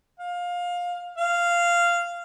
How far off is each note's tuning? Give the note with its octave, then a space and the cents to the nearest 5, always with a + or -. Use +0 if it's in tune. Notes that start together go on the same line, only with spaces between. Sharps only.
F5 +20
F5 -10